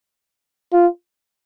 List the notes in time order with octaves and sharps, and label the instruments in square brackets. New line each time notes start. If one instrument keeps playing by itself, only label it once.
[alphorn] F4